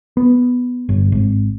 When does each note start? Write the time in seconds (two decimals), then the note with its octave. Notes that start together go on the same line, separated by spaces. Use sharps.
0.17 B3
0.89 G1
1.12 G#1